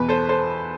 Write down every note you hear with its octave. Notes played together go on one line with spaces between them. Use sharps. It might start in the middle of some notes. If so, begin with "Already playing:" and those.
Already playing: E2 B2 B4
A4 C5
A4 C5